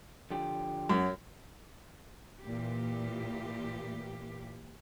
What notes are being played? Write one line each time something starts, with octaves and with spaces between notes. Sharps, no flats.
D3 F3 G4
F#2 F#3
A#2 E3 A#3 G4